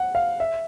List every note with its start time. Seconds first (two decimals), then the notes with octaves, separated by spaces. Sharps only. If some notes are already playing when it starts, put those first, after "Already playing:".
Already playing: F#5
0.15 F5
0.40 E5